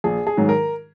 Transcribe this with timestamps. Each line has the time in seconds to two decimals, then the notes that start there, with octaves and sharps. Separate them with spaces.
0.04 A#1 G#4
0.27 G#4
0.37 G#2 D#3 F#3
0.49 A#4